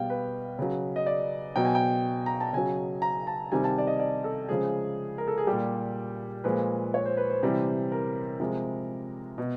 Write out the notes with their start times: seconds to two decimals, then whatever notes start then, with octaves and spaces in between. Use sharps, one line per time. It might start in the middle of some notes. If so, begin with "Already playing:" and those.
Already playing: B2 G3 F5 G5
0.10 B4
0.59 C#3 F#3
0.96 D#5
1.06 D5
1.56 B2 F#3 G5
1.65 G#5
1.75 G5
2.26 A#5
2.41 A5
2.53 C#3 F#3 G#5
3.02 A#5
3.27 A5
3.52 C3 D#3 G3 G#5
3.64 A5
3.78 D5
3.87 D#5
4.00 D5
4.24 A4
4.49 C#3 F3 G#3 G#4
5.18 A#4
5.28 A4
5.38 G#4
5.47 A#2 G3 G4
6.44 A#2 F3 G#3 B4
6.94 C#5
7.06 C5
7.17 B4
7.30 C5
7.43 C3 E3 G3
7.92 A#4
8.40 C3 F3 G#3
9.38 B2